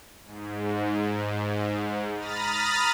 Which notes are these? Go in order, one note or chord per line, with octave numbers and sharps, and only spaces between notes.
G#2
A#5 B5 D#6 F6 A6